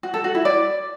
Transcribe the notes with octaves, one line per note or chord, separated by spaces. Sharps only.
F#4
A4
F#4
E4
D5